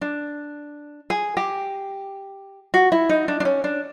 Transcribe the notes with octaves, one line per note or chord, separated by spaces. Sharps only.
D4
G#4
G4
F#4
E4
D#4
D4
D4
C#4
D4